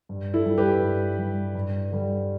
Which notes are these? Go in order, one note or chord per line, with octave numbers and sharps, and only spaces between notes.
G2
E4 A4
G3
G4 B4
G2
G3
G2
D3 G3